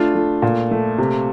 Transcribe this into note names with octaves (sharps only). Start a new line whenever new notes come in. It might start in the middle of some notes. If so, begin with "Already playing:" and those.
Already playing: A3 D4 F4
A3
A#2
A3
C3